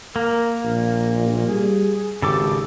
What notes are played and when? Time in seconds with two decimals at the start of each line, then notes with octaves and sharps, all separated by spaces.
0.16 A#3 A#4
0.64 A#1 A#2
1.47 G3 G#4
2.22 G#1 C#3 G4 A4 D6